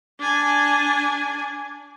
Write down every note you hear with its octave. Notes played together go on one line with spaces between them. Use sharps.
D4 G#5